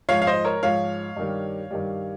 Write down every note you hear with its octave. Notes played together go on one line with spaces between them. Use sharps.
G#2 F3 C#5 F5
F5
C5 D#5
A#4 C#5
G#2 F3 C#5 F5
G2 D#3 G3
G2 D#3 G3